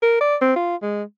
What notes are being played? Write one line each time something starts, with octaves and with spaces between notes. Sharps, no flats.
A#4
D5
C4
F4
G#3